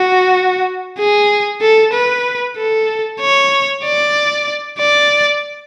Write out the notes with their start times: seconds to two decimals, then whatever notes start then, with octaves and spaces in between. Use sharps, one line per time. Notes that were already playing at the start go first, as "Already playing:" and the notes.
Already playing: F#4
0.98 G#4
1.62 A4
1.93 B4
2.57 A4
3.21 C#5
3.84 D5
4.79 D5